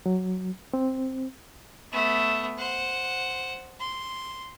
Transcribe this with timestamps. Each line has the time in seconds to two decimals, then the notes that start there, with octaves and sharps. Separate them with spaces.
0.06 F#3
0.74 C4
1.92 A3 B3
2.58 C5 F#5
3.80 C6